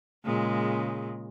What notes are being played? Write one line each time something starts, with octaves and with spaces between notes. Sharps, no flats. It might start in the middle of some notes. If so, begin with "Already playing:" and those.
A#2 C#3 G#3